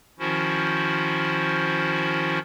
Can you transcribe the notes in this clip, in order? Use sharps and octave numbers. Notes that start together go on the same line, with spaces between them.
D#3 F3 C#4 E4 F#4 C5